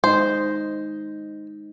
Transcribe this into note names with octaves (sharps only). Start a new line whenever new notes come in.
G#3 D#4 C5 D#5